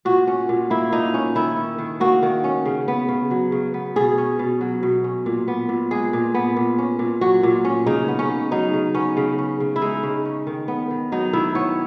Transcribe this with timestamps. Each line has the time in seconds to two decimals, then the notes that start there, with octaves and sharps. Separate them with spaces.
0.05 A#2 F#4
0.27 C#4
0.49 A#2
0.70 A#3 E4
0.92 A#2 D#4
1.14 C#4
1.35 D#3 E4
1.57 C#4
1.78 D#3
2.00 A#3 F#4
2.23 D#3
2.44 C#4
2.65 C#3
2.88 B3
3.09 C#3
3.31 F#3
3.52 C#3
3.74 B3
3.96 B2 G#4
4.18 C#4
4.39 B2
4.61 F#3
4.83 B2
5.04 C#4
5.26 A#2
5.48 B3
5.69 A#2
5.91 G#3 G#4
6.13 A#2
6.34 B3
6.56 A#2
6.78 C#4
6.99 A#2
7.21 F#3 F#4
7.43 A#2
7.65 C#4
7.87 C#3 D#4
8.08 B3
8.19 C#4
8.30 C#3
8.51 F#3 D#4
8.73 C#3
8.95 B3 C#4
9.17 C#3
9.38 C#4
9.60 C#3
9.76 E4
9.82 G#3 D#4
10.03 C#3
10.25 C#4
10.47 D#3
10.68 B3
10.91 D#3
11.12 F#3 D#4
11.33 D#3 E4
11.55 B3 C#5